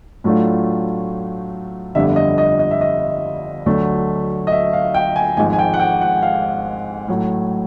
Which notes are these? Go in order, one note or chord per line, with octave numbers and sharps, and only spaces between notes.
A2 F#3 A3 D4 F4
G1 F2 D3 G3 E5
D#5
D#5
D#5
E5
D#5
D2 D3 F#3 A3 D4
D#5
E5
F5
G5
G#5
G#1 G#2 F3 G#5
G#5
G5
F#5
G5
F#5
F5
A2 F#3 A3